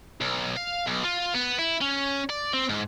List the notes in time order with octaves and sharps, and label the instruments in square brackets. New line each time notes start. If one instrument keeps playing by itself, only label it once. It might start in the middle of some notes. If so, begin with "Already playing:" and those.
[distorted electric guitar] B1
F5
B1
F4
B3
E4
C#4
D5
C4
G#2